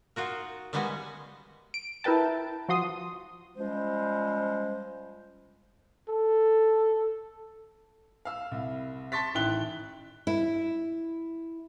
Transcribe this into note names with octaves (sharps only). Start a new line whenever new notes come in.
D#4 F4 F#4 A#4
D#3 G3 G#3 B3 F#4 G#5
D7
E4 A#4 B4 G5 A5
F3 F#4 C6 D#6
F3 G3 G#3 C#4 C5
A4
F5 E6
C2
A5 C6 C#6 A6 B6
A1 D#3 E4 G5 F#6 G7
E4